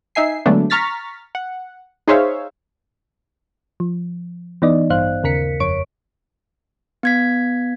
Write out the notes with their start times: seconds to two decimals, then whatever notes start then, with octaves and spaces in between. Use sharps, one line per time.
0.15 D#4 E5 G#5 C7
0.46 D3 F#3 G#3 A3 B3 D4
0.70 A#5 C#6 F6 A6 B6
1.35 F#5
2.08 D#4 G#4 C5 C#5 E5 F5
3.80 F3
4.62 E3 B3 D#4 D5 D#5
4.90 A1 G2 C5 F5 F#6
5.23 D#2 C#3 A#4 B6 C#7
5.60 G1 F2 C#5 C#6 D7
7.03 B3 G#6 B6